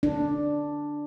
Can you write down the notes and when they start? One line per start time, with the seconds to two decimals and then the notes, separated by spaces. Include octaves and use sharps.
0.03 D4